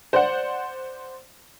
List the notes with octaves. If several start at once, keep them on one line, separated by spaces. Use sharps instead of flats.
C5 D5 F#5